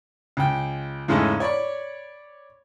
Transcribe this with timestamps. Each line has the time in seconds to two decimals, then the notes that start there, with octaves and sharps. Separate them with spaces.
0.37 C#2 G5
1.08 E2 G#2 C#3 G#3 A3 C#4
1.40 C#5 D5 B5 C#6